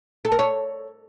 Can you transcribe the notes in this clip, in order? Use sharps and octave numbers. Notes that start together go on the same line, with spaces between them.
A4
A#4
C#5